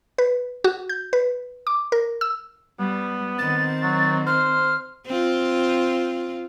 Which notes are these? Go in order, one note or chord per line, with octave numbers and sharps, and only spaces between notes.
B4
F#4
G6
B4
D6
A#4
E6
G3 B3
D#3 C4 A6
F#3
C5 F6
C4 F4